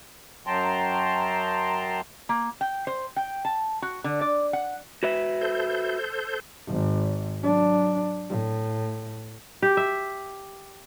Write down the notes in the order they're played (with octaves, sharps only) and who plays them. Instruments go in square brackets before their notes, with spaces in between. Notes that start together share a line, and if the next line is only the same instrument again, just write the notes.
[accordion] F#2 F#3 G5 A5 A#5 C6
[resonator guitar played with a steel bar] A#3
G5
C5
G5
A5
F#4
D3
D5
F#5
[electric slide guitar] F#4 B4 E5
[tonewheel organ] A4 C5 G6
[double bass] G#1
F#3 D4
A2
[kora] G4
E5